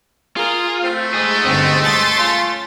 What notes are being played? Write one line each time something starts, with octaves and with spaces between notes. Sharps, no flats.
F4 G#4 A#4
A3 C4
G#2 G#4 D#5
G1 C4
A5 C6 A6
C#4 F4